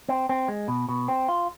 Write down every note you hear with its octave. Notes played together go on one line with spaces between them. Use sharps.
C4
C4
G#3
B2
B2
C4
F4